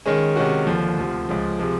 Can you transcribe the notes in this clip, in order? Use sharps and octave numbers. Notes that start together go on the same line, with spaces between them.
D#3 G#3 C#4
C3 D#3 G#3 C#4 F#4
D#2 D3 F3
D2 C3 F3
C#2 C#3 F3
C3 F3 G#3